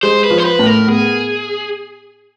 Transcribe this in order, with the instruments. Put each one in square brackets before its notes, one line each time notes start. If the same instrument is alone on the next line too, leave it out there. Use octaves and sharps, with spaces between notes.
[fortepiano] G#3 [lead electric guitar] C5
[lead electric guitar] B4
[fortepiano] F3
[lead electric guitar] C5
B4
[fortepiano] A2
[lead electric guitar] A#4
[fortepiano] B3 [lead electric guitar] G#4